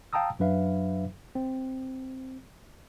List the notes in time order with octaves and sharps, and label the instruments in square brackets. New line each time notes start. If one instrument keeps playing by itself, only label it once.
[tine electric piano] F5 G5 A5 A#5 D#6 E6
F#2 F#3 D4 B4 E5 F5
C4